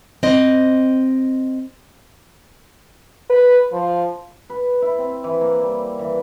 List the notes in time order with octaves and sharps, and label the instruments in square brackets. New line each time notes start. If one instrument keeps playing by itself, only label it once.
[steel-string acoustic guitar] C4 D#5
[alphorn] B4
F3
[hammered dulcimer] B4
E4
C4
E3
A#3
G3
E3